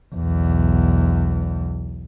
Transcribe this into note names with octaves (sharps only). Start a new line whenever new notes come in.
B1 E2